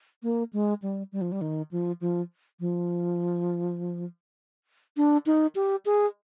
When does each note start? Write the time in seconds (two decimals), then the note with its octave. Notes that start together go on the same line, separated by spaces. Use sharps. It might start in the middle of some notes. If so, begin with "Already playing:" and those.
0.23 A#3
0.53 G#3
0.82 G3
1.12 G3
1.21 F3
1.32 G3
1.41 D#3
1.71 F3
2.01 F3
2.60 F3
4.97 D4
5.26 D#4
5.55 G4
5.86 G#4